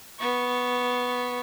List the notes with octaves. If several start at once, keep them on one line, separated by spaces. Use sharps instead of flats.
B3 C#6